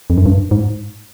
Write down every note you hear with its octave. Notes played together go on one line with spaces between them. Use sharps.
F2
F#2
G2
G#2